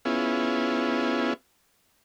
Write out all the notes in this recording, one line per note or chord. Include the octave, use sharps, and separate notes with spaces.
B3 C#4 E4 F4 G#4